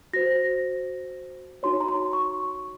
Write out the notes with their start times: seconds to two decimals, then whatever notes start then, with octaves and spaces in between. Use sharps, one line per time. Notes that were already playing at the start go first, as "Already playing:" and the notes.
0.13 F#4 C5 A#6
1.63 D#4 F#4 C#5 C6
1.81 A#5
1.88 C6
2.13 C#6